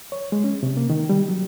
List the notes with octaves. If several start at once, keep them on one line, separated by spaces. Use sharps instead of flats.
C#5
G#3
C#4
C3
A#3
D#3
G3
F#3